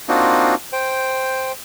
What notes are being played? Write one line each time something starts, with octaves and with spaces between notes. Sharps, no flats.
A#3 C4 D4 D#4 F4 F#4
C5 G5